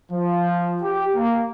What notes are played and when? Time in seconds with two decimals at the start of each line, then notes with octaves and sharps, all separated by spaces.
0.12 F3
0.83 G4
1.15 A#3